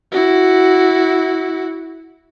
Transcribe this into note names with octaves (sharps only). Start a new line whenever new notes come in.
E4 F#4